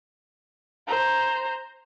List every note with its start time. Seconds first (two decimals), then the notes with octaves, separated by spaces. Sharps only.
0.87 C5 A#5